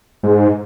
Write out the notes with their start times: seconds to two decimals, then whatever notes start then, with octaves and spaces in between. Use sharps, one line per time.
0.23 G#2